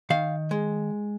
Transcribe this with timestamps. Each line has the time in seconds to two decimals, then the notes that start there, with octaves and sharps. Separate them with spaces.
0.10 D#3 F5
0.51 G#3